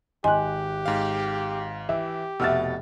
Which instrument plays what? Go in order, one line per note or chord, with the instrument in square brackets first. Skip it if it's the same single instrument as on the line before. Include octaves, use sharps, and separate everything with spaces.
[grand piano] G#1 F#6 [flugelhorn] G4 [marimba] D#5 G#5 C6
[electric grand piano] G#2 F5
[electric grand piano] E3 [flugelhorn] G4 [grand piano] E5
[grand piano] F1 F6 A6 [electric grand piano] B2 F#5 [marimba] E5 E6